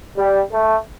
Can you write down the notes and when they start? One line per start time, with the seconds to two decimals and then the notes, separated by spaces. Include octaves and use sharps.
0.17 G3
0.51 A3